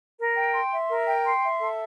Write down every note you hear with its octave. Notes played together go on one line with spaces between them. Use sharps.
A#4
G5
C6
E5
A#4
G5
C6
E5
A4